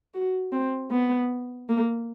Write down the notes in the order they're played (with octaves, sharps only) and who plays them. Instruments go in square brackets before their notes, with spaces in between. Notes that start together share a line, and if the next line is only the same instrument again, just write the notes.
[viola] F#4
C4
B3
A#3